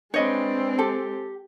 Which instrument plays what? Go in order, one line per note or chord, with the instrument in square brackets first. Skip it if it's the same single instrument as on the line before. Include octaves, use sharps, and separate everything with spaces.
[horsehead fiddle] G#3 C4 [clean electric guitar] D4 B4 [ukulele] C#5 D#5
[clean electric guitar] G4 [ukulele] A4